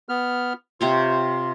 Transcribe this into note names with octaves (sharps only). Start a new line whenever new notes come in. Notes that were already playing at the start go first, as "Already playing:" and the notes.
B3 F6
C3 F4 C5 C#5